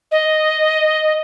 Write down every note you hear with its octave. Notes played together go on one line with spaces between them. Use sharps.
D#5